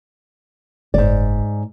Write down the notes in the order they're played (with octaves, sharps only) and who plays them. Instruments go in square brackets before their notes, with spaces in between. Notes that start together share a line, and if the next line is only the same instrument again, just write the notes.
[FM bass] F#1 [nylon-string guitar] G#2 D5